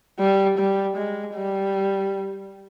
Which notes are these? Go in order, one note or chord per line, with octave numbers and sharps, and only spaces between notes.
G3
G3
G#3
G3